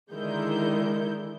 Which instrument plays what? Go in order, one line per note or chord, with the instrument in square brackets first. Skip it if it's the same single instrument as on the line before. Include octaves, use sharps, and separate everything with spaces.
[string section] D3 D#3 G#3 E4 A#4 G6